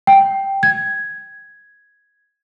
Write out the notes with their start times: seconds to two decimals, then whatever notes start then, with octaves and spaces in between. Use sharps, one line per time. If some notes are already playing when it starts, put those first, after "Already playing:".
0.07 G5
0.63 G#6